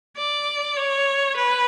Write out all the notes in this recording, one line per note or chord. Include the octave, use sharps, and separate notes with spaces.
D5
C#5
B4